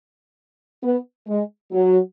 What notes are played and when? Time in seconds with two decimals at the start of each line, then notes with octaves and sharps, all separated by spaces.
0.82 B3
1.27 G#3
1.71 F#3